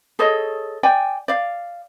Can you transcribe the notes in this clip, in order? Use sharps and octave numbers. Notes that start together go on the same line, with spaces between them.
G#4 A4 C#5 D#5
D5 G5 G#5
D5 F5